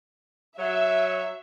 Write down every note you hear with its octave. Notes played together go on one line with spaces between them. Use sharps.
F#3 E5